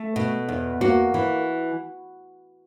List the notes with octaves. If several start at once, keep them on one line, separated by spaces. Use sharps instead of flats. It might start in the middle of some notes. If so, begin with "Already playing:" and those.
Already playing: A3
B2
E2
A#3 F#4
E3